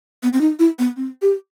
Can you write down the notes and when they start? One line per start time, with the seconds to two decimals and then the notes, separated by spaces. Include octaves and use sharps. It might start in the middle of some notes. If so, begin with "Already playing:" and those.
0.23 B3
0.33 C4
0.41 D#4
0.59 E4
0.79 B3
0.96 C4
1.22 G4